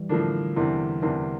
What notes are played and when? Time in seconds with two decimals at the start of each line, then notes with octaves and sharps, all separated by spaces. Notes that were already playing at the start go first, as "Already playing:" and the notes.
Already playing: E3 G3
0.09 A2 D3 F3 A#3 D4
0.56 E2 C3 E3 A#3 D4
1.02 E2 C3 E3 A#3 D4